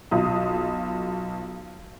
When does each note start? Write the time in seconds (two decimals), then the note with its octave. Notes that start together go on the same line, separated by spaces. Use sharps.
0.11 B1 F4 D#6